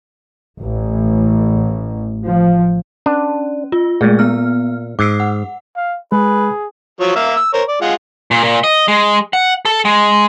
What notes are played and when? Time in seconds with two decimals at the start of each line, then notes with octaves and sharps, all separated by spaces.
0.61 A1
2.27 F3
3.06 C#4 D4
3.72 F4
4.01 A#2 G#3 A3 G#4
4.19 B3 F6
4.99 G#2 D6 E6 C7
5.20 F#5
5.76 F5
6.12 G#3 G#4 B4
7.00 F3 F#3 C#5
7.16 A#3 E5 F5
7.37 E6
7.54 A#4 C5 C#5
7.68 D5
7.82 G#3 F4 F#5
8.31 A#2
8.44 A#2
8.64 D#5
8.88 G#3
9.33 F#5
9.65 A4
9.85 G#3